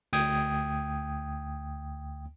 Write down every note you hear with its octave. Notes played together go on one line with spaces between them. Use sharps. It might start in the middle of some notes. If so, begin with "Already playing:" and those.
D2 G5 D#6 G#6